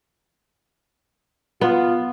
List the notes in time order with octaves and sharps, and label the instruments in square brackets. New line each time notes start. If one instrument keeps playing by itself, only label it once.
[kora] B3 [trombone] F4